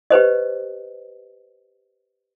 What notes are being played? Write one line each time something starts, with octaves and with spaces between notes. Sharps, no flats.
G4 B4 C5 D#5